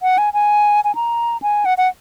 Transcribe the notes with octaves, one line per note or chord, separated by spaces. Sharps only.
F#5
G#5
G#5
G#5
A#5
G#5
F#5
F#5